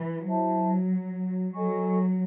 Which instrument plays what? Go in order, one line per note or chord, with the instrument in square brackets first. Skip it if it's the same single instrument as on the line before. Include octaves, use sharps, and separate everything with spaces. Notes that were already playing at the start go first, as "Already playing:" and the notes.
Already playing: [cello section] E3
[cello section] F#3 [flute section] E4 C5 E5 A5
[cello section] F#3 [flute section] A4 D#5 G#5 C#6